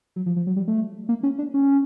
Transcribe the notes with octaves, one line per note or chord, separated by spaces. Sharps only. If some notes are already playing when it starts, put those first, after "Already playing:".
F#3
F3
F3
F#3
G3
A3
A#3
C#4
D4
C#4